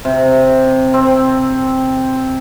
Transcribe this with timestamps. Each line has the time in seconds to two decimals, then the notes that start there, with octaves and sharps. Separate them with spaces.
0.05 C3
0.94 C4